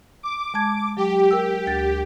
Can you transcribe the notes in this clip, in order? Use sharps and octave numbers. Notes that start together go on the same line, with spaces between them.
D6
G#3 A5 G#6
F#3 G4
A#4 G5 E6
D2 A6